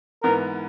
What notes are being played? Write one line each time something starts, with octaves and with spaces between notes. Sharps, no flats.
G#2 E3 B3 A#4